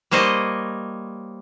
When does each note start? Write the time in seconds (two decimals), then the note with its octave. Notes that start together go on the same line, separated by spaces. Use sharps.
0.11 G3 A#3 C5 C#5 D#5